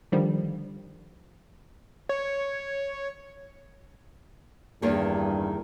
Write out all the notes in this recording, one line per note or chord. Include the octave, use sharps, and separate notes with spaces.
D3 D#3 F3 G3
C#5
E2 G2 D#3 A#3